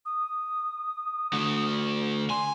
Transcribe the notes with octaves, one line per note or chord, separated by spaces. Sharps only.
D#6
D3 A3
G#5 C6